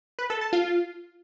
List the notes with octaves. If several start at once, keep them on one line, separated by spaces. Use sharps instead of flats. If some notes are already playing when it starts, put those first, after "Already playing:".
B4
A4
A5
F4